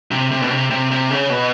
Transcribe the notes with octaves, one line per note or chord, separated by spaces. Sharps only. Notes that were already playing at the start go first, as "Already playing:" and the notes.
C3
C3
B2
C3
C3
C3
C#3
B2